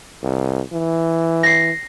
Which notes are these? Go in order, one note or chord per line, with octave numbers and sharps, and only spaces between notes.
C2
E3
A#6 C7